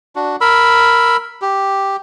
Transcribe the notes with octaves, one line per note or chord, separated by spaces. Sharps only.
D4 F#4
A#4 B5 E6
G4